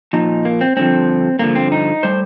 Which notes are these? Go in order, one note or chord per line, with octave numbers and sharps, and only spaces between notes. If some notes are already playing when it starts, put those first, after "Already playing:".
A#2 F3 D#4
A#3
C4
G2 D3 F3 C4
G2 D3 F3 A#3
C4
D#4
A2 G3 C5